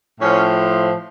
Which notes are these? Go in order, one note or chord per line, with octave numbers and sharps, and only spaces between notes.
A2 F3 C#4